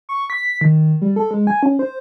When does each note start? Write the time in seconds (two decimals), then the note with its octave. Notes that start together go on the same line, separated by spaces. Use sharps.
0.09 C#6
0.30 B6
0.61 D#3
1.02 G3
1.16 A4
1.31 G#3
1.47 G#5
1.63 C#4
1.79 C5